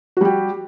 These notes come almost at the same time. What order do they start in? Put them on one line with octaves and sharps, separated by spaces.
F#4 G3 G4